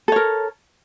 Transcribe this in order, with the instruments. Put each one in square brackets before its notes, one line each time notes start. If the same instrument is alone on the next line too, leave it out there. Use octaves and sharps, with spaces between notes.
[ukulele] A4
C#5
A#4